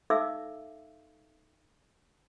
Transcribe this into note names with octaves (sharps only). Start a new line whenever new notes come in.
D#4 A4 E5 F5 D6 E6